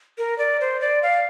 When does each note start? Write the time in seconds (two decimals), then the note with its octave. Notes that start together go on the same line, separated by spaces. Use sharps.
0.18 A#4
0.38 D5
0.61 C5
0.81 D5
1.03 F5